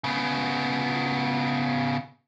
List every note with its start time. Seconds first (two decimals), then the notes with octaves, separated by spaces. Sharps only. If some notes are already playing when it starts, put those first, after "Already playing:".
0.04 C#3 B3